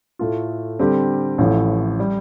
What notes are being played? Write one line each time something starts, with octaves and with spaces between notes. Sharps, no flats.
A2 A3 F4
D3 G3 C4 G4
A1 A2 F3
G3